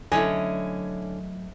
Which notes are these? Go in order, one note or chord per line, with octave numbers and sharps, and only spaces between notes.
D3 F#3 A3 C#4 E4 D#5 G#5